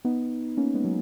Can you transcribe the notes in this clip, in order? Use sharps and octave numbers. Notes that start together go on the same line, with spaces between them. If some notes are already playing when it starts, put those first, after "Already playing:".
B3 D#4
A#3 C#4
G#3 B3
F#3